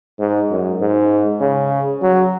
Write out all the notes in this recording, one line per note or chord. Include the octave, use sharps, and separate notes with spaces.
G#2
F#2
G#2
C#3
F#3